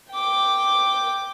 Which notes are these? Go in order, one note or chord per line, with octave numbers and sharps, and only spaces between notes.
G5 D6